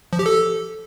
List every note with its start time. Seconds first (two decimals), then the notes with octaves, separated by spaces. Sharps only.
0.13 F3
0.19 G4
0.26 A4